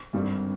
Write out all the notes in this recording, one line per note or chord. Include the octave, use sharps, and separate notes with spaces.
G#1 G2 D3 G3